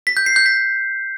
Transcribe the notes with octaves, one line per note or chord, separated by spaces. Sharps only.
B6
G6
C7
G6
B6